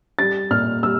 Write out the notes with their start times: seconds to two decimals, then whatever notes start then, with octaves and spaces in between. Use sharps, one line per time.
0.19 G3 A6
0.51 A#2 F6
0.83 G3 E6